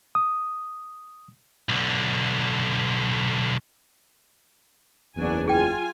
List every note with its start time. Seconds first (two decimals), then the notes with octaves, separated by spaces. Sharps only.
0.15 D#6
1.69 B1 D3
5.16 F#1 E2 F#3 D4 G#5
5.48 F4 G#4 G5 G#5